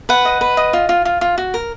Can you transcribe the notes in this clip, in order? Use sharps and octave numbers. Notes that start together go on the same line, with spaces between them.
B4 F#5
D#5
B4
D#5
F4
F4
F4
F4
F#4
A#4